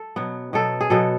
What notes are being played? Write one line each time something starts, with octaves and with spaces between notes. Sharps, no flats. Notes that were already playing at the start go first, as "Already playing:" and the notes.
Already playing: A4
B2 F#3 B3
B2 F#3 B3 A4
G#4
B2 F#3 B3 A4